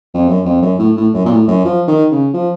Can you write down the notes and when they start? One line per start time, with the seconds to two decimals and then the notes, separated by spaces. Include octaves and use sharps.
0.14 F2
0.28 F#2
0.45 F2
0.62 F#2
0.79 A2
0.96 A2
1.14 F#2
1.25 A#2
1.31 A2
1.48 F#2
1.65 F3
1.87 D#3
2.11 C#3
2.34 F3